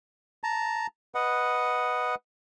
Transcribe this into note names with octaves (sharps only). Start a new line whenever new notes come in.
A5 A#5
B4 D#5 F#5